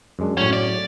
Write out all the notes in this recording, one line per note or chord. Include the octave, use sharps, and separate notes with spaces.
F#2 G#3 D4
A2 F#3 C#4
D5